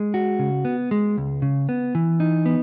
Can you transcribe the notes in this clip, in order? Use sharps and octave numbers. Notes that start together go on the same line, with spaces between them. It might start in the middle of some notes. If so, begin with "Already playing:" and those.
Already playing: G#3
F#4
C#3
B3
G#3
C#2
C#3
B3
E3
D#4
B3